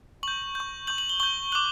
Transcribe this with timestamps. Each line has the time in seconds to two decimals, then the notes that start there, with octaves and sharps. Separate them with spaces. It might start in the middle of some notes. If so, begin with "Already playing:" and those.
0.23 C#6 G6 F#7
0.55 C#6 G6
0.87 C#6 G6 F#7
0.98 F#7
1.09 G7
1.20 C#6 G6 G7
1.52 D6 F#6 F#7